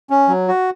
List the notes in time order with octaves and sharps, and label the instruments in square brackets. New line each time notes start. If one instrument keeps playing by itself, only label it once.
[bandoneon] C#4
F#3
F#4